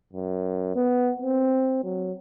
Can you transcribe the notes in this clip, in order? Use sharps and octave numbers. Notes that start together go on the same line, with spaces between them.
F#2
B3
C4
F#3